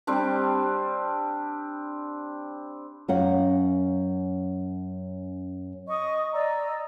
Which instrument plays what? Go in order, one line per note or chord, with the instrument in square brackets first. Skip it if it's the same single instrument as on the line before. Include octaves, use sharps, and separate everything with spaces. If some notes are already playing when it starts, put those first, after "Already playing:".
[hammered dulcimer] G3 C4 D4 G4
[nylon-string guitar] F#2 C#4 F5 F#5
[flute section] D#5 C#6 D#6
D5 D#5 A#5 E6